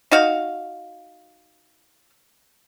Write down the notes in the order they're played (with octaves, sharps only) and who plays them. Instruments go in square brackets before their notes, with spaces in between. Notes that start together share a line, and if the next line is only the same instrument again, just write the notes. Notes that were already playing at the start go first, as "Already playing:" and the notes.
[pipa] D#4 F#4 F5